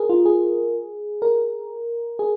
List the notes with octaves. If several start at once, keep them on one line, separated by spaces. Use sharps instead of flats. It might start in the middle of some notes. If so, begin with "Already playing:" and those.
Already playing: G#4 A#4
F4
G#4
A#4
G#4